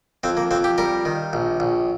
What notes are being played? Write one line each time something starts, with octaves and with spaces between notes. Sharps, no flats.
F2 C4
A#3
F2 C4
G4
G3 A#4
D#3
A#1
A#1